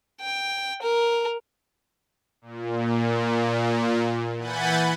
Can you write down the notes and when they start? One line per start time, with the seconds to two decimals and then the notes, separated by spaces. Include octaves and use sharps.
0.21 G5
0.82 A#4
2.42 A#2
4.37 E3 F#5 G#5 B5 G6 A6